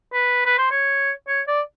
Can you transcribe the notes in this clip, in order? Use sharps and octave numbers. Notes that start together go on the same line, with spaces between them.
B4
B4
C5
C#5
C#5
D5